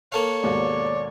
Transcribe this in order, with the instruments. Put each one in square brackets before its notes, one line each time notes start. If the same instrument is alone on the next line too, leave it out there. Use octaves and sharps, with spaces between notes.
[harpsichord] A#3 A4 F5 [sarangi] C#5
[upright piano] D#2 G#2 B2 [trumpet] D5